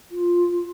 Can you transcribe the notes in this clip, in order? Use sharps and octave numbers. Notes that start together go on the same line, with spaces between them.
F4